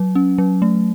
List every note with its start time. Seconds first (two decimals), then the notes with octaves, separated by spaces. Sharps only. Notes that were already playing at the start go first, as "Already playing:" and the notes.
Already playing: F#3
0.15 C#4
0.38 F#3
0.62 A3